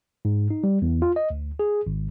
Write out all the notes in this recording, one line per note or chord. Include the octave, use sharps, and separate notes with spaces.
G#2
D#4
G3
E2
F4
D#5
D2
G#4
G#1